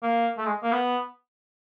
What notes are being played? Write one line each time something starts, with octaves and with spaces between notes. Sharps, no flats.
A#3
A3
G#3
A#3
B3